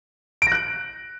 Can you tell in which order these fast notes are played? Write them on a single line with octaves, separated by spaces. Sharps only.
D7 A#6 F#6